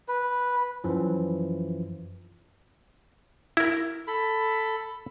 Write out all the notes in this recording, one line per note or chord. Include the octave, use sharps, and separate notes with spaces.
B4
F#2 E3 F3
E4 A#4
A4 B5